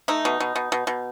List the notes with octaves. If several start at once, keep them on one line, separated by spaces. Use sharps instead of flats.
A3 D#4
B2
B2
B2
B2
B2